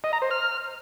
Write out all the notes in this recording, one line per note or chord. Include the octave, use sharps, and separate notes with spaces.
D#5
A#5
C5
F6